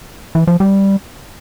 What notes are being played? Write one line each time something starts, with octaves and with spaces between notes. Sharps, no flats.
E3
F3
G3